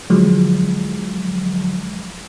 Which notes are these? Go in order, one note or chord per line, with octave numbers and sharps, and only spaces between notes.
D3 F3 F#3 G#3